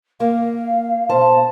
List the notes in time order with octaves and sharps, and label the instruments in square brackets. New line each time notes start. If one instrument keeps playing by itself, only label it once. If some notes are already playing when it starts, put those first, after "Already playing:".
[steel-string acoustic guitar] A#3 [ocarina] F5
[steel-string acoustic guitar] B2 C5 A5